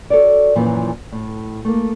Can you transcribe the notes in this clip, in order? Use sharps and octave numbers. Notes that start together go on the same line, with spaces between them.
F#4 A4 A#4 C#5 D5
F#2 A#2 E3 F3
A2
A3 A#3